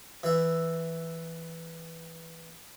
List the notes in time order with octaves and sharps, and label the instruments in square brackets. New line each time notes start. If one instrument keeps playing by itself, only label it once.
[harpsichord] E3 E5